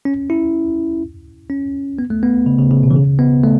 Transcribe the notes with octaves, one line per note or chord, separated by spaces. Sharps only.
C#4
E4
C#4
B3
A3
B3
C#3
C#3
C#3
B2
E3
C#3
B3
A3